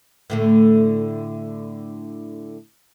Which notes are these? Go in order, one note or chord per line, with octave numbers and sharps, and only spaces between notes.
A2 D3 A3